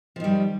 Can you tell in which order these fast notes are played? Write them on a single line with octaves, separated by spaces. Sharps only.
F3 D#3 G3